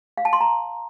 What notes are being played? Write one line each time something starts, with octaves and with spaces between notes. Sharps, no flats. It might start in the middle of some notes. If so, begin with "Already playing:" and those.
F5
A5
C6
A#5